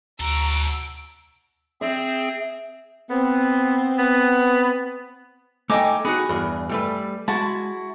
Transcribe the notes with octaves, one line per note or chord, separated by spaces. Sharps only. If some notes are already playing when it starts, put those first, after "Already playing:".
D2 F#4 A4 A#5 E6 D7
C4 G#4 E5
B3 C4
B3
A3 D#4 D#5 G5 G#5 D6
B3 D#4 F#4 G#4
E2 G2
G3 A3 B4
G#3 E4 F#4 A5